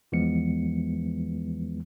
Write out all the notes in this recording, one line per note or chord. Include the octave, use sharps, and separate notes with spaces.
E2 E3 F3 G#3 B3 C#7